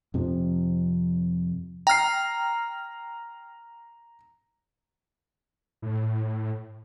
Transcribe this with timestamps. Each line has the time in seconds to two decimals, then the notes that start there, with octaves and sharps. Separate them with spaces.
0.14 F2 C3 F3
1.87 G5 A#5 F6 C7
5.82 A2